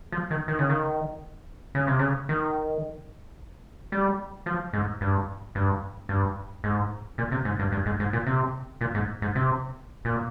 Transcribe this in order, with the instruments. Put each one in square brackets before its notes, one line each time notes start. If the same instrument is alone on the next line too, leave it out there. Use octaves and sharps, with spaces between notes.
[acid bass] F3
D#3
D#3
C#3
D#3
C#3
C3
C#3
D#3
G3
F3
G#2
G2
G2
G2
G#2
A#2
C3
G#2
G2
G2
G#2
G#2
A#2
C3
A#2
G#2
G#2
C3
A#2